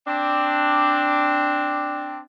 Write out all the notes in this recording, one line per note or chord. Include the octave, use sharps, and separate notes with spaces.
C4 D4